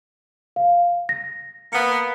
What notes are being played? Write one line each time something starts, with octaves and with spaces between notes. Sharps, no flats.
F5
A#6
A#3 B3 C#7